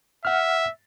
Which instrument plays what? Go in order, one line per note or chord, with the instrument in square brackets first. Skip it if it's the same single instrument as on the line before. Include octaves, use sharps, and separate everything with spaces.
[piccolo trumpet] E5 [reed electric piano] F#5 F6